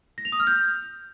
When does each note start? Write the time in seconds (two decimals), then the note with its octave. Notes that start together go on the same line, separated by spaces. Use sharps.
0.18 A#6
0.25 F7
0.32 D#6
0.40 F6
0.47 G6